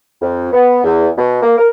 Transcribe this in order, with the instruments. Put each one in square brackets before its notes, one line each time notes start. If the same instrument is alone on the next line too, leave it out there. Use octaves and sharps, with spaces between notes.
[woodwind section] F2
B3
E2
B2
A#3
A#4